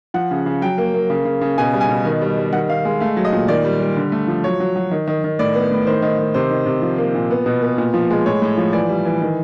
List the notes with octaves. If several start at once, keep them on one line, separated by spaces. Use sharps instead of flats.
F3 F#5
C#3
C#3
F#3 G5
A#3
A#3
C#3
C#3
C#3
B2 G#5
G3
G#5
B2
D#3
G3
G3
D#3 F#5
D#3 F5
G#3
A3 F5
F#3
D#5
A#2
D#3 D5
G3
G3
D3
A3
F3
F#3 C#5
F#3
F#3
D#3
D#3
D#3
A2 D5
B3
A2
D#3 C5
D#3
D#3
C3 C5
D#3
C3
F3
A#3
A#2
B3
B2
B3
A#2
F3
G#3
A2 C#5
A2
F3
E3 D5
G3
E3
D#3